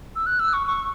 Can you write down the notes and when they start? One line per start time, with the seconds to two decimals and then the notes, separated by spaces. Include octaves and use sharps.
0.15 E6
0.26 F#6
0.39 E6
0.53 C#6
0.67 C#6